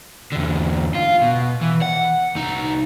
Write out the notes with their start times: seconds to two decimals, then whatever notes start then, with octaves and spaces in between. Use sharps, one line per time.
0.32 E2 D3
0.95 F4
1.22 B2
1.61 E3
1.82 F#5
2.35 C2 D#4